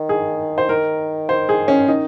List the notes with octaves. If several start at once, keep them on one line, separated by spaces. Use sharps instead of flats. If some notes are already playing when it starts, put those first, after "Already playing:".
Already playing: D#3
G#4
C5
D#3 A#4
C5
G#4
C#4
D#3 D#4